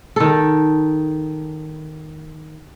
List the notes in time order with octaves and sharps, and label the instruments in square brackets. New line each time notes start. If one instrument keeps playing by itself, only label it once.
[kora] D#3 A4